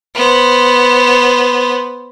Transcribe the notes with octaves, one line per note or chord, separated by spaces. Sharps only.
B3 C5